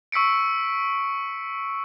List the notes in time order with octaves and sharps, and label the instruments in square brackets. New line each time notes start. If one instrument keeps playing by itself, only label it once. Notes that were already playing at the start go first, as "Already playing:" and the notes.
[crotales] C#6 E6 B6 C#7 D7